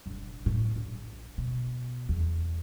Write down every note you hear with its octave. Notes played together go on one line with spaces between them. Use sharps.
F1 A#1
A2
A#1
B2
E2